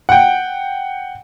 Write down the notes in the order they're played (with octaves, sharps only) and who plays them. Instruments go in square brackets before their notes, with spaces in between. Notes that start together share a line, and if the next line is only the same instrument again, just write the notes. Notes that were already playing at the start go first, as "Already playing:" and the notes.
[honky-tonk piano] F#5 G5